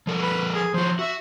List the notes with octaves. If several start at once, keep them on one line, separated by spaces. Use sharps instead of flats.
F3 A4 A#4
B4
G#4
F3 F#4 C5
F#4 E5